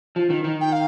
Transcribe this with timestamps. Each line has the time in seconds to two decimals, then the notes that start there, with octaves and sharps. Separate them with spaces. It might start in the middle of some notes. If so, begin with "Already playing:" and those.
0.16 F3
0.30 D#3
0.44 D#3
0.61 G5
0.72 F5